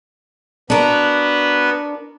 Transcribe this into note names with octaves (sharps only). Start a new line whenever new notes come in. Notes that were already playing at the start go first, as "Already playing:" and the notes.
B3 D4 F#4 A#4 B4